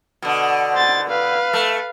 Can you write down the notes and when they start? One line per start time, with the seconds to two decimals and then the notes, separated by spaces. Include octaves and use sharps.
0.22 B2 D3
0.73 C5 A6
1.09 B4 F5
1.53 A3